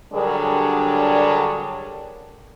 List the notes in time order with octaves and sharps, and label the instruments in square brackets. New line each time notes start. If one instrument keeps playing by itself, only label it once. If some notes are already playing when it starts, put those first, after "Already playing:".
[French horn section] D3 F#3 G3 D4 G#4 A#4